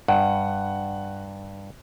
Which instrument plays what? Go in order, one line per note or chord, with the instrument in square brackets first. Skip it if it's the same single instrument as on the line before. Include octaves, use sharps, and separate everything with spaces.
[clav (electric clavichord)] G2 [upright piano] F#5